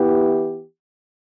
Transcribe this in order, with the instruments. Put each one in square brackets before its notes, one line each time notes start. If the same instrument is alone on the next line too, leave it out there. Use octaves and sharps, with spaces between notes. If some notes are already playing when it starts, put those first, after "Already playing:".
Already playing: [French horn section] E3 B3 E4 G4